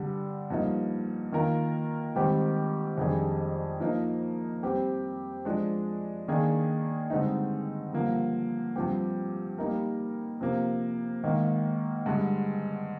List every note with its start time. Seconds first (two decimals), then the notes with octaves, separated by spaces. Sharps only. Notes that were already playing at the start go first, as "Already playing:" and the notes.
Already playing: G2 D3 G3 D4
0.50 G2 F3 A#3 D#4
1.32 D#3 A#3 F4 A#4
2.15 G#2 D#3 G3 C4 G4
2.98 F2 D#3 G3 D4 G#4
3.80 F3 A#3 D#4 A#4
4.63 G3 C4 G4
5.45 F3 G#3 D4
6.28 D#3 A#3 D4 G#4
7.10 G2 D3 G#3 C4 D#4
7.93 G2 D3 F3 A#3
8.76 G2 F3 C4 G4
9.58 G3 A#3 D#4 A#4
10.41 C3 F3 A#3
11.23 G#2 D#3 A#3
12.06 G2 D3 G#3